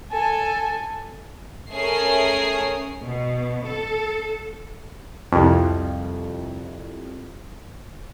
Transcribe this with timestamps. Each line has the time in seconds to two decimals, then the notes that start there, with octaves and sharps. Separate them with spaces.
0.12 A4 G#5
1.73 A3 C#4 G#4 A#4 C7
3.03 B2
3.65 A4
5.32 C2 F2